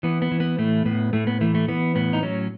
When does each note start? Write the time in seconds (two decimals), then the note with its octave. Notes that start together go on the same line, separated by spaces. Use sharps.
0.03 E3 B3
0.22 B3
0.32 E3
0.40 B3
0.58 A2 A3
0.85 A2 B3
1.13 A2 A3
1.27 B3
1.41 E3 A3
1.55 A3
1.68 E3 B3
1.95 A2 B3
2.13 D#4
2.23 F#3 C#4